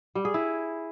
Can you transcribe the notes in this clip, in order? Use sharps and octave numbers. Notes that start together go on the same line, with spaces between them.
G3
G#4
E4